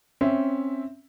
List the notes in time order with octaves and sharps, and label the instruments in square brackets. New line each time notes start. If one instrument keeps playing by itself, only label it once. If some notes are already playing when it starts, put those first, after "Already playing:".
[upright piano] C4 C#4 E5